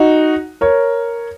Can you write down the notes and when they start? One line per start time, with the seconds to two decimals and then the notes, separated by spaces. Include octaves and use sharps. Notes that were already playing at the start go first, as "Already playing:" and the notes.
Already playing: D#4 F#4
0.61 A#4 C#5